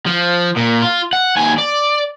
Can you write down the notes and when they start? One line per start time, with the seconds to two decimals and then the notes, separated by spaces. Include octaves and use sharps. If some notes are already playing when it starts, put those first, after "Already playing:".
0.07 F3
0.56 A#2
0.82 F4
1.13 F#5
1.37 D#2 G#5
1.58 D5